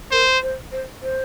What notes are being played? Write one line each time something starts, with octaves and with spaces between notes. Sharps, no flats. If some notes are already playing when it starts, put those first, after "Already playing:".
A#4 C5
C5
C5
C5